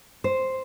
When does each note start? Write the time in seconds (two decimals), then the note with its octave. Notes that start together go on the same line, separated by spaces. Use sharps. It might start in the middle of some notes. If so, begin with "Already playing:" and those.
0.24 C5